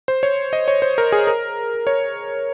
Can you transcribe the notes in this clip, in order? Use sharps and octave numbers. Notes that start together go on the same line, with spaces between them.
C5
C#5
D#5
C#5
C5
A#4
G#4
A#4
C#5